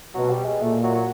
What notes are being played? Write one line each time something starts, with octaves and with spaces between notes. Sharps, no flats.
B2 F#3
G3
G#3
A#2 A3
F#3
F#3